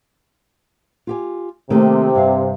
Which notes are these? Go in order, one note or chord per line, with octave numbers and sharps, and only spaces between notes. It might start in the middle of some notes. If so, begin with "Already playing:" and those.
F4 G4 G#5
C3 D#3 A3 A#3
G2 F5